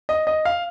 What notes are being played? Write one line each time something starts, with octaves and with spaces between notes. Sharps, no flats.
D#5
D#5
F5